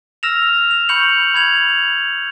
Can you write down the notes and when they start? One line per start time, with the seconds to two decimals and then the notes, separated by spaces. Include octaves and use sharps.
0.23 E6 F6 A#6 E7 F7
0.71 F7
0.89 B5 C#6 G6 C#7 F7 F#7
1.34 B5 G#6 F7 F#7